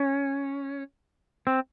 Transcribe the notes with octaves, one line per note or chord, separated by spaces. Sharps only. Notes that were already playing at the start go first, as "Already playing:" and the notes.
Already playing: C#4
C4